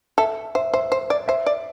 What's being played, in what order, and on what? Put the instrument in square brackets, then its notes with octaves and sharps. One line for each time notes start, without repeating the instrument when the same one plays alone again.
[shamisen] A4 [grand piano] E5
[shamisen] C5 [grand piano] E5
[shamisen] C5 [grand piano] E5
[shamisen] C5
D5
[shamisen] C5 [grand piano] E5
[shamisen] D5